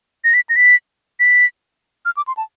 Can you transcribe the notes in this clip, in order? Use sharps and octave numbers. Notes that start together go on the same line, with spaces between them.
A#6
B6
A#6
B6
B6
F6
D6
C6
A5